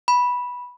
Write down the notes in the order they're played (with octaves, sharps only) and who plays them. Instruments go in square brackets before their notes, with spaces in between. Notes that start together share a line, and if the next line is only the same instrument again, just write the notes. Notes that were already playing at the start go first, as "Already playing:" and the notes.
[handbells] B5